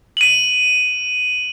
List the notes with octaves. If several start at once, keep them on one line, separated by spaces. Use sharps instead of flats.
D#7 F#7